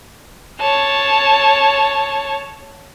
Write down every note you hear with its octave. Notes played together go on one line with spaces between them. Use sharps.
C#5 A5